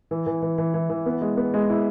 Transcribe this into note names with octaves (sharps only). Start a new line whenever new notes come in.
E3
E3
E3
E3
E3
E3
B3
G#3
B3
G#3
E4